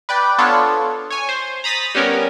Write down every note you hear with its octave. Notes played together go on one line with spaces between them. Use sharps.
B4 D5 G5
B3 D4 F4 A4 C#5
C#5 G#5
C5
A#5 B5 D#6 A6 B6
G3 B3 C#4 A#4